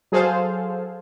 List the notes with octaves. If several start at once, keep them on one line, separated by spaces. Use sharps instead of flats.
F#3 G#4 A4 C5 F5